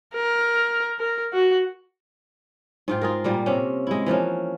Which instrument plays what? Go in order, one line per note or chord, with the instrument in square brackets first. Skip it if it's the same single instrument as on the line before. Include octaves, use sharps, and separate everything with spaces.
[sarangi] A#4
A#4
F#4
[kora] G#2 F4 G5
F4 G#4 A#4
A#2 G3 A#3
C3 C#4
G#3 E4
E3 F3 A#3 C#4